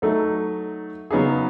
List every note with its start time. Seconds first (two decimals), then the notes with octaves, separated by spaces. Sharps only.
0.02 F#3 A3 D#4 A4
1.11 C#3 F#3 B3 D#4 G#4